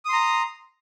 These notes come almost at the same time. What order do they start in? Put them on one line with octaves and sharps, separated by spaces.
D#6 C6 A#5